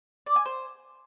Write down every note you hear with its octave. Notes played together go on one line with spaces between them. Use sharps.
D5
G#5
C5